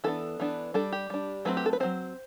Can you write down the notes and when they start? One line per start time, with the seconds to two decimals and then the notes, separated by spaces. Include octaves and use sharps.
0.04 E3 B3 D4 A4
0.40 E3 B3 D4
0.74 G3 D4 A4
0.92 G4
1.10 G3 D4
1.45 F#3 A3 C4 B4
1.57 G4
1.66 A4
1.73 B4
1.80 F#3 A3 C4 C5